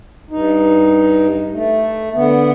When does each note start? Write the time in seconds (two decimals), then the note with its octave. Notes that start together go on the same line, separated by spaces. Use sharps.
0.31 G2 D#4
1.53 A3
2.14 D3 B3